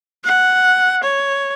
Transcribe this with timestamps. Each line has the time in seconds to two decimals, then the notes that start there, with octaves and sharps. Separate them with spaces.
0.24 F#5
1.03 C#5